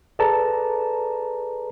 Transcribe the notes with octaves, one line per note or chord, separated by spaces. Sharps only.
G#4 A4 B4 D5 A5 A#5